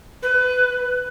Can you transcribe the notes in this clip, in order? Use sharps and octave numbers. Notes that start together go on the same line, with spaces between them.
B4